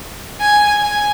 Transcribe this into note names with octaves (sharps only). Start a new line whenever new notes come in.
G#5
G#5